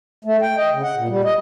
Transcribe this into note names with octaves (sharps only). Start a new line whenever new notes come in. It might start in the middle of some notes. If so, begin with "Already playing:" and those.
A3
G5
D#5
C#3
F#5
A#2
G3
D#5